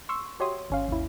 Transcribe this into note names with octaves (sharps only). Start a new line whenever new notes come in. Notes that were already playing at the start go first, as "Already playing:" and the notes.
C6 C#6 E6
F#4 G4 C#5 E5 C6 D#6
G#1 C#4 F5
G#1 D#2 E4